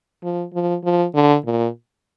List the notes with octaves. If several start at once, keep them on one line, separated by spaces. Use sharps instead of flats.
F3
F3
F3
D3
A#2